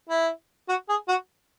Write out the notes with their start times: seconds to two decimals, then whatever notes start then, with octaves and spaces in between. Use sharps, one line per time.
0.09 E4
0.69 F#4
0.89 G#4
1.08 F#4